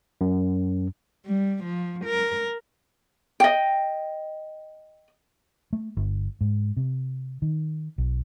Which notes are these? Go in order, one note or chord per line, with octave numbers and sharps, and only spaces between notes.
F#2
G3
F3
A#4
D#5 G5
A3
G1
G#2
C3
D#3
B1